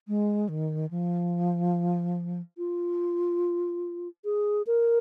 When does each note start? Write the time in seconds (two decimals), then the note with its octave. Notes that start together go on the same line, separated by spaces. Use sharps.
0.08 G#3
0.49 D#3
0.91 F3
2.58 F4
4.25 G#4
4.67 A#4